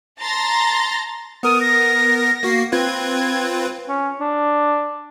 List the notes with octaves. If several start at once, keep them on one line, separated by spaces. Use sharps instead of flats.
A5 A#5 C6 A6 A#6
B3 A#4 D#6
A#6
A#3 F#4 C7
C4 F4 B4 G#6
C#4
D4